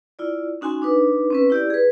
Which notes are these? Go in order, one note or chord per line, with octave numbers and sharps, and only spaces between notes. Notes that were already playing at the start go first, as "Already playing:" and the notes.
E4 F4 D5
C#4 D#4 F#4 G#5 C6
D4 D#4 B4
C4 C#4 B4
E4 G4 D5
G#4 B4